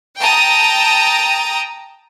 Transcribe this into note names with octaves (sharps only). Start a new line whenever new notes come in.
G5 A5 A#5 D#6